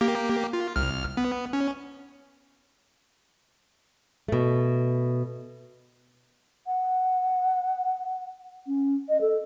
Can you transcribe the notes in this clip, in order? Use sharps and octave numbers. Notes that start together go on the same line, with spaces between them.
A#3 G4
F4
C2 F6
B3
C#4
B2 A3
F#5
C#4
D#5
A4